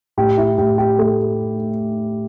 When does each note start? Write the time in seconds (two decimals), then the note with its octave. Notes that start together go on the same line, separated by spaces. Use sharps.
0.17 A2 G4
0.38 E4
0.58 A2 G4
0.78 G4
0.99 A3